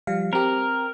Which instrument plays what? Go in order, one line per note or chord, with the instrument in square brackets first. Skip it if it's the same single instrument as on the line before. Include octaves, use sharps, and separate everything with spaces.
[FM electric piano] F3 G3 F5
[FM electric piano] C4 G4 [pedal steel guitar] A#4